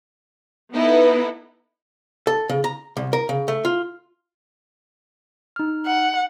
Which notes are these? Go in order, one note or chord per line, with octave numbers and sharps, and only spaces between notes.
B3 D#4 E4 A4
A4
C#3
A#5
C2
A#4
C#3
A3
F4
D#4 F6
F#5